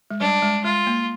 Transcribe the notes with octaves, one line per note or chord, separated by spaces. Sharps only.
G#3
G3 D4
G#3
G#3 F4
A#3